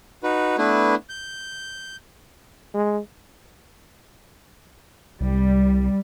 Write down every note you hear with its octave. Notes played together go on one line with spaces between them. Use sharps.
D#4 F#4 B4
A3 B3 D4 E4 B4
G6
G#3
C2 G3